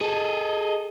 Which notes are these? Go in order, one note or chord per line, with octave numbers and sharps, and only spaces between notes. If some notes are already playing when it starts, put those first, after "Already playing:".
G#4 A4 D#5